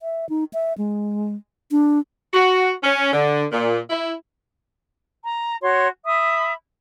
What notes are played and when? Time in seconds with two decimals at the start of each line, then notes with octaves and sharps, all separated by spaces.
0.01 E5
0.29 D#4
0.53 E5
0.78 G#3
1.71 D4
2.34 F#4
2.83 C#4
3.13 D3
3.51 A#2
3.90 E4
5.25 A#5
5.62 F#4 C#5 C6
6.05 E5 B5 D#6